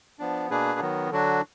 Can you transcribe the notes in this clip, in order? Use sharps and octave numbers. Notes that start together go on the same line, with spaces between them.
F3 B3 D4
B2 A#3 D4 G#4 B4
D#3 F#3 B3
D3 F#3 D4 F#4